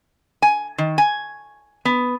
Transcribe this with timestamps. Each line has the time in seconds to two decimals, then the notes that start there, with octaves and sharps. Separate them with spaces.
0.42 G#5
0.78 D#3
0.98 G#5
1.85 B3